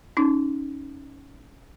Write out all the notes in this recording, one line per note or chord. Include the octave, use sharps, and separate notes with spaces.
C#4 D#4